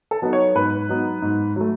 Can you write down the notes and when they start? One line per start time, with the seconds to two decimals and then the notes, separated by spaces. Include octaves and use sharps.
0.11 A4
0.22 F#3 B3 D#4
0.33 C#5
0.55 G#2 B4
0.89 F#3 B3 D#4
1.22 G#2
1.56 F#3 A3